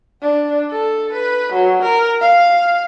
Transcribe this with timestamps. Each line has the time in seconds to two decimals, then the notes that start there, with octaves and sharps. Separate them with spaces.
0.21 D4
0.71 A4
1.13 B4
1.53 F#3
1.83 A#4
2.21 F5